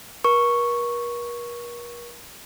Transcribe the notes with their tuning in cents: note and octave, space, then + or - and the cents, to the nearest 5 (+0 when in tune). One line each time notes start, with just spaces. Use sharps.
A#4 +40 C#6 +0